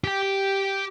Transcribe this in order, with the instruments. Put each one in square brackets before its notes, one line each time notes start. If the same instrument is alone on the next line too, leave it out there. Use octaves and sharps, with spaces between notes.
[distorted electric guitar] G4 G5